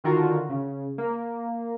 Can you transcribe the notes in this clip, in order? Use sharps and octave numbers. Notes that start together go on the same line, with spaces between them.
D3 D#3 F4 F#4 A#4
C#3
A#3